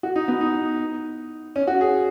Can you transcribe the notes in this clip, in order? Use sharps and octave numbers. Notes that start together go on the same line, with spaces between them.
F#4
D#4
B3
D#4
C#4
F#4
G#4